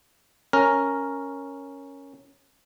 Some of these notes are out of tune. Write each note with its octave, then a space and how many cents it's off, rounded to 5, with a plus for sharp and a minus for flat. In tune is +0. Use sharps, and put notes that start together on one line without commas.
C#4 +0 A#4 +0